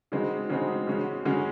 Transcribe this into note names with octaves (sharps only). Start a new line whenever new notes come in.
C#3 G#3 C4 D#4 F#4
C#3 G#3 C4 D#4 F#4
C#3 G#3 C#4 F#4
C#3 G#3 C#4 F#4